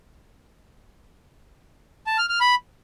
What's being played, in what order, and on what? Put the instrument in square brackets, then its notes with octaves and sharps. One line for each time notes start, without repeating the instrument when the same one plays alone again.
[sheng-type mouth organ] A5
F6
F6
B5